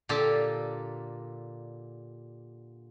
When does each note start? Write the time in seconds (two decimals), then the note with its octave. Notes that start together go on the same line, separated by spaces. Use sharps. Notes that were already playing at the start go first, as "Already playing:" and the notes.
0.09 A#2 D3 A#3 G4 A4